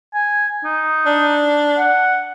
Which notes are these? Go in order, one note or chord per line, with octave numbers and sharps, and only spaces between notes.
G#5
D#4
D4
F#5